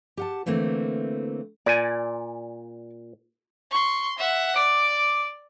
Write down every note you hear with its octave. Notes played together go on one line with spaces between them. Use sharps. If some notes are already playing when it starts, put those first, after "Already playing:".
G4 F#5 A5
D3 E3 A3 A#3 C4
A#2 D5 G#5
C6 C#6
E5 F#5
D5 D6